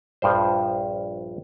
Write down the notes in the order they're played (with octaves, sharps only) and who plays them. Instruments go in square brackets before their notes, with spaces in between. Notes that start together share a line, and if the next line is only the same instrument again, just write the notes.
[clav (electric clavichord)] A#1 G2 F3 C5